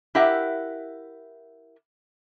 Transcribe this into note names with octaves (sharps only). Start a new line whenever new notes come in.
E4 G4 A#4 E5 F#5